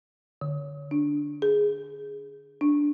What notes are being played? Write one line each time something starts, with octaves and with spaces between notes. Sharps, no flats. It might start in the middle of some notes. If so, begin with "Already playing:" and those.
D3
D4
G#4
D4